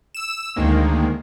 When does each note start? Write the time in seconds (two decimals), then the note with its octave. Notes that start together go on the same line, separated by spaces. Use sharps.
0.15 E6 E7
0.56 D2 D#3 G#3 A#3